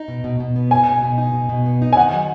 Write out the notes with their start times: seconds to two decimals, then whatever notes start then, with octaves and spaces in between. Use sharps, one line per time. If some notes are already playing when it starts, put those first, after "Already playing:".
Already playing: D#4
0.08 B2
0.24 B2
0.40 B2
0.56 B3
0.71 D#4 G#5
0.87 B2
1.03 B2
1.18 D#4
1.34 B2
1.49 B2
1.66 B3
1.82 D#4
1.93 G#5
1.97 D#3 F#5
2.13 F#3